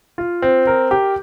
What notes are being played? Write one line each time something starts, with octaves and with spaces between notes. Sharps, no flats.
F4
C4
A#4
G4